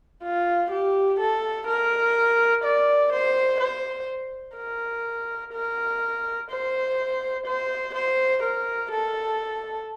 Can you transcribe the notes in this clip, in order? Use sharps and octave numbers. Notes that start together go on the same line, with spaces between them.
F4
G4
A4
A#4
D5
C5
C5
A#4
A#4
C5
C5
C5
A#4
A4